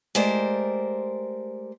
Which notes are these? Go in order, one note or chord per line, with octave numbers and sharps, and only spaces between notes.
G#3 A3 G4 A#4 C5 D5